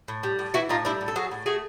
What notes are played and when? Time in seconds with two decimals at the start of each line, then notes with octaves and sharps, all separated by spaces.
0.08 A2
0.23 G3
0.39 A2
0.54 E3 E4 F#4
0.69 A2 D#4 F4
0.85 G3 D4 E4
1.01 A2
1.08 A4
1.16 F#3 F#4 G#4
1.31 A2
1.46 A3 F#4 G#4